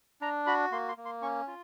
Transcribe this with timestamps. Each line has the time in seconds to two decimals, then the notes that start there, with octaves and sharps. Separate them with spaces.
0.21 D4 A#5
0.47 F#4 B5
0.71 A#3 C6
0.89 C6
0.97 A#3
1.05 C6
1.22 C#4 C#6
1.47 F4